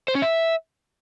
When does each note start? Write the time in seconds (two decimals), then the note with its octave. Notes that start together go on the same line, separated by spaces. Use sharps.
0.08 C5
0.15 C#4
0.22 E5